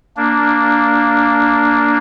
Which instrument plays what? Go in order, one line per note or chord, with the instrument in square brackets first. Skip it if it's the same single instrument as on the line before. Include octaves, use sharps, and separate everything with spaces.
[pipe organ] A#3 D4